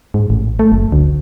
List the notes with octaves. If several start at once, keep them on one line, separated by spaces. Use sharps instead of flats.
G#2
A1
A3
F#1
D2